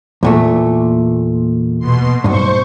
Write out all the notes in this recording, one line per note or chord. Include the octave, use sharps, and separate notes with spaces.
E2 A#2 A3
B2 C6
B1 G2 C5 C#6